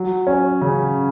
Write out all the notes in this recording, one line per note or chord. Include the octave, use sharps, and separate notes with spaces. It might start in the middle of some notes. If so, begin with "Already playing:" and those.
Already playing: F#3
C#4
C#3